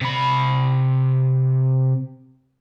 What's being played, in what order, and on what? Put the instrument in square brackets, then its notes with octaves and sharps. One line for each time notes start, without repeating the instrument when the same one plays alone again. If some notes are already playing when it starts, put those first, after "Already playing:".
[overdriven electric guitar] C3 B5